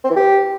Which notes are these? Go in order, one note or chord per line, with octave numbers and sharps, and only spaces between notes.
C4
E3
G4